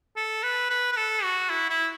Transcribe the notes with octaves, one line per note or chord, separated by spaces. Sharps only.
A4
B4
B4
B4
A4
F#4
E4
E4